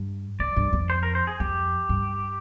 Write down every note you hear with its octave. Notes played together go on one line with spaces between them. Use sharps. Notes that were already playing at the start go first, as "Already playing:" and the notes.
Already playing: G2
F2 D5
G2
F2
C5
A#4
C5
G#4
F2 G4
G2